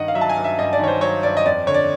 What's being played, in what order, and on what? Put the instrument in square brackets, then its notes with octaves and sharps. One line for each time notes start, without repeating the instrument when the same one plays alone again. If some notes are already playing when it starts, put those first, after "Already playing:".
Already playing: [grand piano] G2 D#3 D#5 F#5
F5
F#3 E5
A5
G#5
G2
E5
G2 D#5
D5
D#3 C#5
C5
F#3 C#5
G2 D5
D#5
F2 D5
D3 C#5
D5